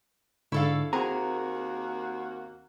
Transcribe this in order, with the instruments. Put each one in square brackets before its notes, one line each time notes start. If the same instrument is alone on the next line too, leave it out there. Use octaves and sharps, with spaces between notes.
[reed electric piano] G#2 D3 C#6 [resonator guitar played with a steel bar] E4 A4 F5
[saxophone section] D#2 A#3 F#4 [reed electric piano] C4 [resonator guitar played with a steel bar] G#4 [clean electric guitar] A#5